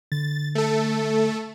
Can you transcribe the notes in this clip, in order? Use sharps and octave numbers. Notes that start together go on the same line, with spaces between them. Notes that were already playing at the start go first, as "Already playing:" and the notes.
D3 A6
A3 A4